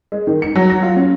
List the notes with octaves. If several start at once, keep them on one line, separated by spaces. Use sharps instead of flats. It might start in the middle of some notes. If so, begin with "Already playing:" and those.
G#3
D#3
C#7
F#3
A#6
F4
C#4